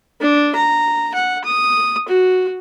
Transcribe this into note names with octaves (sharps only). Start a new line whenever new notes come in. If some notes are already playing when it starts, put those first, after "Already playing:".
D4
A#5
F#5
D#6
F#4